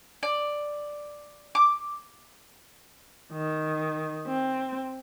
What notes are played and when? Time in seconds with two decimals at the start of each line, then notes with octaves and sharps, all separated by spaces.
0.23 D5
1.55 D6
3.33 D#3
4.27 C4